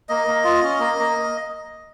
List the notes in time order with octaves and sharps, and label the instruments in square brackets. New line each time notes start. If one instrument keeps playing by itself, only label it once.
[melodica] A#3 D#5
A#3
F4
C#4
A#3
A#3